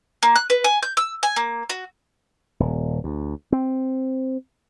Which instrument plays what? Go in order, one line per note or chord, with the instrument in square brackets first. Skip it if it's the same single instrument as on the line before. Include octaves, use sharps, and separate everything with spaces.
[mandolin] A#3
F#6
B4
G#5
G6
E6
G#5
A#3
F#4
[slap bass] D#1
D2
C4